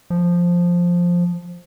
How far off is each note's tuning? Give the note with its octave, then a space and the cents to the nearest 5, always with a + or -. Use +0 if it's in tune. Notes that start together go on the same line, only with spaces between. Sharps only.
F3 +5